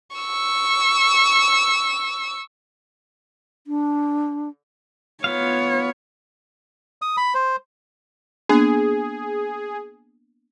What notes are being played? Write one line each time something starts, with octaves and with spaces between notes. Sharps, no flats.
C#6 E6
D4
B3 F4 C#5 F5
D#6
B5
C5
A#3 B3 D4 G#4